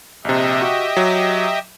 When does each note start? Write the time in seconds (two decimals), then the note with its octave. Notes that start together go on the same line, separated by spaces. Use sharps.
0.25 A#1 C3 G4 D#5 E5
0.62 F#4
0.97 F#3